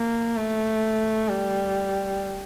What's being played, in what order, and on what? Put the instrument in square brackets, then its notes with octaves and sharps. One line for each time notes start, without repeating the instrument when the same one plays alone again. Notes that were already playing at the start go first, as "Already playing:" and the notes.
Already playing: [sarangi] A#3
A3
G3